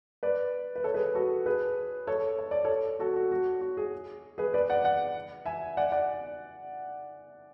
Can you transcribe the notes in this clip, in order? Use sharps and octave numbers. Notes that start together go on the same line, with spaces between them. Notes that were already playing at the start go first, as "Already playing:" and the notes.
B4 D5
B4
A4 C#5
G#4 B4
F#4 A4
G#4 B4
A4 C#5
C#5
D5
A4 C#5
F#4 A4
F#4
F#4
F#4
G#4
G#4 B4
B4 D5
D5 F#5
D5 F#5
E5 G#5
D5 F#5
D5 F#5